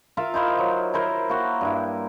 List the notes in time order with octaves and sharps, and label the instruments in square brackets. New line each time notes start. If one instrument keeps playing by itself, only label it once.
[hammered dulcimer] F4 A#4 E5 F5
D#4 E4 C5 F5
F#3
E4 A#4 C5
A#3 F#4
G2 E4